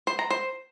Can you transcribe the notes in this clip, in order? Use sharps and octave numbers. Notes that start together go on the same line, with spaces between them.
C5
A#5
C5